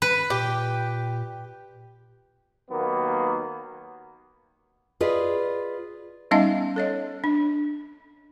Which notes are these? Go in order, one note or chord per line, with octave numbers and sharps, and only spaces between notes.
B4
A#2 G4
D#2 D#3 F#3 A#3 B3
F4 G#4 B4 D5 D#5
G3 B3 C#4 D#4 D#5 F5
A4 C#5 D#5
D4